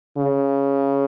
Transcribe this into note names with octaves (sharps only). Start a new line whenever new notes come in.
C#3